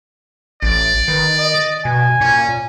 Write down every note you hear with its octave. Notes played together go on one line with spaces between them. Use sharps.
A1 D5
D#3 B4
D#5
B2 G#5
A#2 C#4